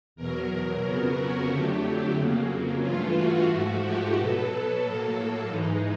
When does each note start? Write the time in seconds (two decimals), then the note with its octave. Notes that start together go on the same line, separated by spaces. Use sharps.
0.16 E2 B2 F#3 A#4
0.82 F2 C#3 F#3 B3 A#4
1.16 F#4
1.48 F2 D3 F#3 A3 G4
2.15 F2 C#3 F#3 A#3
2.81 G2 E3 A3 F4
3.15 F#4
3.47 G#2 F3 A3
3.81 G4
4.14 B2 F#3 B3 A4
4.81 A2 F#3 A#3
5.47 G#2 E3 G#3 D#4